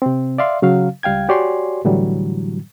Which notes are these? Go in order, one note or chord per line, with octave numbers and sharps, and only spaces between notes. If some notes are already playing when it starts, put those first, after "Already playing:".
C3 C4
D5 E5 F5 C6
C#3 F#3 F5
C#2 G3 F5 G5 G#6
F#4 G4 C#5 D5 G#5 C6
A2 D3 E3 F#3 G3